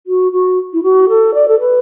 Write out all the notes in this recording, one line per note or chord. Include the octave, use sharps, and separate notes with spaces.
F#4
F#4
E4
F#4
A4
D5
A4
B4